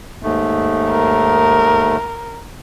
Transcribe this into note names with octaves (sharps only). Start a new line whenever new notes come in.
D#2 G#2 A3
A#4